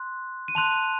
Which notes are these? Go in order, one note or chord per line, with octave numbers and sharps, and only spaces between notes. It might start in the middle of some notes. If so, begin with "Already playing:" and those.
Already playing: C6 F#6
D#7
A5 C6 F#6 F7